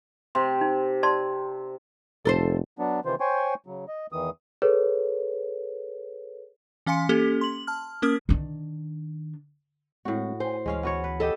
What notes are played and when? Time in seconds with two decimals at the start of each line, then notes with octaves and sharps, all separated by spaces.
0.35 C3 C6
0.61 D#4
1.03 D5 A5 C6
2.25 F1 A4 A#4 C5
2.79 F#3 B3 D4
3.05 C3 D#3 E3 F4 C5
3.20 C5 C#5 G5 G#5 C6 C#6
3.66 C#3 F#3
3.88 D#5
4.12 E2 D#3 E3 D#6
4.62 G#4 A4 B4 C#5
6.86 E3 C#4 F5 G#5 C6 C#7
7.09 A#3 C#4 G4 A4
7.41 C6 F#7
7.67 A5 F6
8.02 A#3 C#4 A#4 D#6 F6
8.29 D#3 D4
10.05 A2 G#3 C4 F#4
10.40 C5 G5 G#5
10.66 D2 E3 G#3 C#4 F5
10.83 B3 F#4 C#5
11.04 B4
11.20 G4 A4 D#5 E5